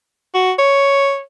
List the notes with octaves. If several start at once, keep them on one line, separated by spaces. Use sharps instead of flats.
F#4
C#5